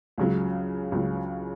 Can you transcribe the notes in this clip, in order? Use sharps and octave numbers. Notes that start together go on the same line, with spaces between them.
C#2 C#3 F#3
C#2 C#3 F#3